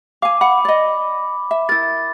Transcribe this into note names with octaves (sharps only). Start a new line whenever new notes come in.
F5 G#5 D6
F#5 B5
D5 D#5
E5
E4 A#4 A6